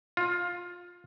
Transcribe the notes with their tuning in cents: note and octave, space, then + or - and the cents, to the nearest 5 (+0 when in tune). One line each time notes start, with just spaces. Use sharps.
F4 +15